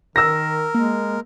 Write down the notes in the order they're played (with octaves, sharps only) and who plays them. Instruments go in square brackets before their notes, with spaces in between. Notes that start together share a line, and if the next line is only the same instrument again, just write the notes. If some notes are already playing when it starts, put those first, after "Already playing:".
[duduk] D#3 [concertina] A#4 [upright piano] E6 A#6
[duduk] G#3 [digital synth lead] A#3